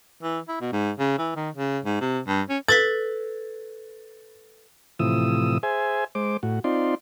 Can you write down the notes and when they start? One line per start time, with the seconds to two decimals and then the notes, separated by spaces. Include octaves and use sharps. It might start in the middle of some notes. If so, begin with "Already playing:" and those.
0.23 E3
0.49 E4
0.61 B2
0.73 G#2
0.99 C#3
1.19 E3
1.36 D#3
1.55 C#3
1.85 G#2
2.01 C3
2.27 G2
2.49 C#4
2.68 A4 B4 A6 B6
4.99 A2 C3 E3 F3 D#6 E6
5.63 G#4 C5 E5 G#5
6.15 G#3 C5 D6
6.43 A2 F#4
6.64 C4 D#4 F4 D5 C6